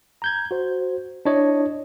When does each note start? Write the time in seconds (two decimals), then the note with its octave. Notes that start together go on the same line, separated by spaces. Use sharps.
0.22 A#5 G6 G#6
0.51 F#4 C5
1.25 D4 E4 C#5 D#5